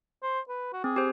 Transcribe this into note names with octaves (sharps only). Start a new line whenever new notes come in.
C5
B4
F#4
C4 G#4
G4 C5